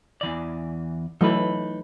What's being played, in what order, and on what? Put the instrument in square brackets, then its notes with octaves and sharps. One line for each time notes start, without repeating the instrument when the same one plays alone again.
[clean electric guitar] E2 E3 D5
[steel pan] E3 F#3 A3 [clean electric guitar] D#4 B4